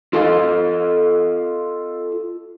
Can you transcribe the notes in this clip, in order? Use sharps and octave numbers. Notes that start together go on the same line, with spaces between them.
F4 A4 D#5 F5